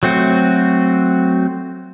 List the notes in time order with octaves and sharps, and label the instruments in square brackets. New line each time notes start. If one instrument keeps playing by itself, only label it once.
[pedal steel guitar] F#3 A3 C4 F#4